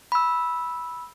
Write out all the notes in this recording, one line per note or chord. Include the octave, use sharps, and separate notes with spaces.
B5 E6